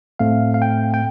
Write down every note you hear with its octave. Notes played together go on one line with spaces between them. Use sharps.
A2 A3 C4 F5
F5
G5
G5